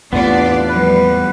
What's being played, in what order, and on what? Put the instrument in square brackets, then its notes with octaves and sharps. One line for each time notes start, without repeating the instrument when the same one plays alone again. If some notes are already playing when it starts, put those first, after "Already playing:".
[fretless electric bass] E2 A2 C3 [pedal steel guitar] B3 [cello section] D4 F4 D5
[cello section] F3 G3 [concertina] B4